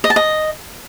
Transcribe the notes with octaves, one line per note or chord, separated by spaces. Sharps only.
D#5
A5
D#5